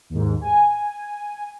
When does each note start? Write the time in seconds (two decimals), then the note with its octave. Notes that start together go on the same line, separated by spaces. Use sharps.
0.10 D#2 G#2
0.41 G#5